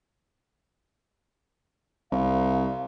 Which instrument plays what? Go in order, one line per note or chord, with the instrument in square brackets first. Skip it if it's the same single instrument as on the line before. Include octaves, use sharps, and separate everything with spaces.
[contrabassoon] C2 [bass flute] F5